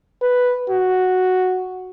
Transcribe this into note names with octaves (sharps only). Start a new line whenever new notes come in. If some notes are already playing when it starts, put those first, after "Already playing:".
B4
F#4